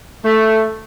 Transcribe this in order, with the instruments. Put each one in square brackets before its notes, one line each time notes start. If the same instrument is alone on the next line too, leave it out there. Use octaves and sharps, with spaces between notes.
[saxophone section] A3